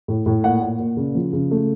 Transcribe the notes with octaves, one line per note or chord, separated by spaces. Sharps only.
A2
A2
A#2 F#5
A#2
A#2
C#3
F3
C#3
A3